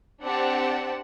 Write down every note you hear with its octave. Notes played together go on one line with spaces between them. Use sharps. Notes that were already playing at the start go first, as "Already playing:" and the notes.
C4 D4 G4 F#5 A5